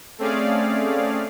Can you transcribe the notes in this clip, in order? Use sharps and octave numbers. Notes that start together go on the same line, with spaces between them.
A3 C4 C#4 G#4 D5 F5